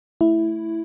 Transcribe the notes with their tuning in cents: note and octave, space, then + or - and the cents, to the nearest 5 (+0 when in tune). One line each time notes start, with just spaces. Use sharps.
A3 +0 E4 +0